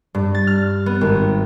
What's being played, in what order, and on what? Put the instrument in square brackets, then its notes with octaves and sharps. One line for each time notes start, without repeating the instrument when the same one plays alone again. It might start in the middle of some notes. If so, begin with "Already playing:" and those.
[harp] G2
A6
F6
B3
G#1